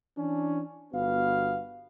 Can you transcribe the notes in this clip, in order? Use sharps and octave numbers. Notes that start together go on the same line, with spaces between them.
E3 C#4 D4
G1 B3 F#4 F5